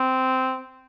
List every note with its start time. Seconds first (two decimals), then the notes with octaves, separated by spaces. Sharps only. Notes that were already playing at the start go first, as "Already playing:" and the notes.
Already playing: C4